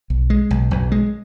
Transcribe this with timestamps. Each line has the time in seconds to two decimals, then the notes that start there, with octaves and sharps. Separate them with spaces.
0.10 B1
0.30 G#3
0.51 B1
0.71 B1
0.92 G#3